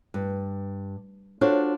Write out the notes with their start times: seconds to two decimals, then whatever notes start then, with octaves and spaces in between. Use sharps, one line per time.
0.14 G2
1.41 D4 F4 F#4 A4 C5 C#5